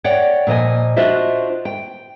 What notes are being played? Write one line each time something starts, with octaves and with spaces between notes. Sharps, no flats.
C#5 D5 F#5 G5
A#2 F3 D#5 G#5
D4 F4 F#4 C5 D#5 E5
G5